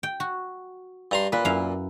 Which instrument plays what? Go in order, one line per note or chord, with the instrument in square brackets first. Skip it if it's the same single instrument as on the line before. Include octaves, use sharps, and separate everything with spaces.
[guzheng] G5
F#4
[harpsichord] G2 A#5 C6
[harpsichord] A#2 [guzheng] B4
[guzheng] F#2 E4 F5